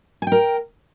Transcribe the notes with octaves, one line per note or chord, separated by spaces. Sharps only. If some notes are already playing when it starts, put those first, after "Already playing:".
A#4 G5 G#5